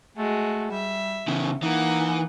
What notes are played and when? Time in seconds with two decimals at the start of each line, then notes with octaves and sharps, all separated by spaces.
0.17 G#3 A3 F#4
0.71 G3 E5
1.28 C#3 E3
1.63 E3 A#3 D#4 F#5